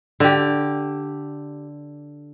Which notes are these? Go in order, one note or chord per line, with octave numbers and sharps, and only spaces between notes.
D3 G4